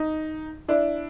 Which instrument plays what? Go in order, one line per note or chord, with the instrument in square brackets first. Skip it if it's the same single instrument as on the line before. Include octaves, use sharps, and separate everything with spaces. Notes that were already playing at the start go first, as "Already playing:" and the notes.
Already playing: [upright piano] D#4
D4 E4